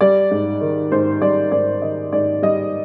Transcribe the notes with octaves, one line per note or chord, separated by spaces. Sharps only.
G3 D5
G#2
D#3
G#2 C5
G3 D5
G#2 D5
D#3 D#5
G#2 D5
G3 D#5